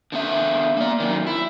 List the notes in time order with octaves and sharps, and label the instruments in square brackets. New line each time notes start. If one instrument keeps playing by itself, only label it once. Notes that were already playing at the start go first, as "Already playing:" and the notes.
[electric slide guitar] D3 B3 E5
A#3 D5
F#2 D#3
E4